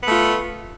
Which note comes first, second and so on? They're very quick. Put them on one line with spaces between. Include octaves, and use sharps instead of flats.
B3 A3 F4